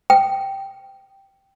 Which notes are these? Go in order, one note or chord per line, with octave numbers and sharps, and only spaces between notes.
G5